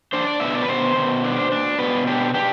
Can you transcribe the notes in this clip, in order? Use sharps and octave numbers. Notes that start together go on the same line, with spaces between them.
D4 C5
D5
B2 E5
D5
B4
B2 C5
B2
D4
D4
B2 B4
D4 G4
D4 G4